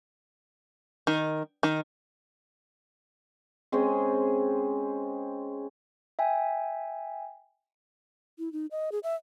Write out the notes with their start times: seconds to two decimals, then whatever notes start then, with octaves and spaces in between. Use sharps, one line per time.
1.07 D#3
1.63 D#3
3.72 G#3 C4 C#4 G#4
6.19 E5 G5 G#5
8.39 E4
8.53 D#4
8.71 D#5
8.92 G#4
9.03 E5